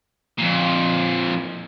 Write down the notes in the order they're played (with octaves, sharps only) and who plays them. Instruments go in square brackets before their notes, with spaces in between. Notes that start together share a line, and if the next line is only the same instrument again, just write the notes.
[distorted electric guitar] F2 A#2